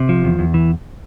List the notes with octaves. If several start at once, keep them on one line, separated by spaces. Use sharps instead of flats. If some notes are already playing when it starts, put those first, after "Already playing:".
Already playing: C3
F3
E2
E2
E3